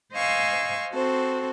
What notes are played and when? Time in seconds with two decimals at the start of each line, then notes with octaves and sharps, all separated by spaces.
0.14 C5 D#5 F5 G#5 C#6 E6
0.93 C4 F#4 A4 C5